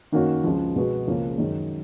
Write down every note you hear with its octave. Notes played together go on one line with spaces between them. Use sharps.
D#3 A#3 C#4 F#4
C#2 C#3 F3
B2 G#3 B3 F#4
C#2 C#3 F3 A#3 C#4
F#2 D#3 G#3